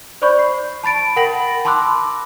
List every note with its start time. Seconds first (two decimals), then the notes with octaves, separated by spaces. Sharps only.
0.22 C5 D5 B5 C#6 G6
0.39 C7
0.83 A5 B5 A6 D7
1.16 A#4 F#5 G5 B5 A#6 F#7
1.65 A5 B5 C6 D6 E6 F#6